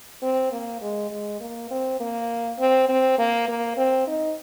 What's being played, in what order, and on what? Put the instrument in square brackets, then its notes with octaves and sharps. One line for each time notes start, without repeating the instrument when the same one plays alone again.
[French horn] C4
A#3
G#3
G#3
A#3
C4
A#3
C4
C4
A#3
A#3
C4
D#4